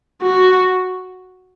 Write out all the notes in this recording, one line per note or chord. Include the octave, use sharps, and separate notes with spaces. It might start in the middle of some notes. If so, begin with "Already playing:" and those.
F#4